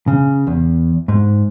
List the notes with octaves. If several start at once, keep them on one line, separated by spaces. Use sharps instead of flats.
C#3
E2
G#2